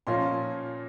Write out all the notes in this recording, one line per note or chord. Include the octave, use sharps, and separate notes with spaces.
A#2 F3 A#3 C#4 C6